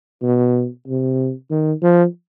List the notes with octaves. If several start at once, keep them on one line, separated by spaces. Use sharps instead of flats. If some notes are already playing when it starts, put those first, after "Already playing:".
B2
C3
D#3
F3